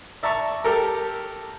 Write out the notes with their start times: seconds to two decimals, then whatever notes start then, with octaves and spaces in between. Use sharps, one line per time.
0.23 D5 E5 A5 A#5 C#6
0.64 G4 A4 A#4